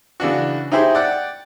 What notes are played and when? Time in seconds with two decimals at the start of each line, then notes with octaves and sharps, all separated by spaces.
0.20 C#3 E3 D4 F#4
0.72 D#4 E4 G4 G#4 C5
0.95 D5 F#5 G5